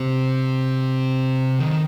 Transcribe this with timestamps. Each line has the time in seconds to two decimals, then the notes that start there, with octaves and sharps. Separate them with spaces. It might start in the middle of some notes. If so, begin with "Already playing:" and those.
Already playing: C3
1.60 D#3